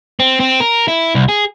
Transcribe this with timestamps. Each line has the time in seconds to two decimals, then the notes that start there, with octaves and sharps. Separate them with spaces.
0.20 C4
0.40 C4
0.60 A#4
0.88 E4
1.15 C2
1.29 G#4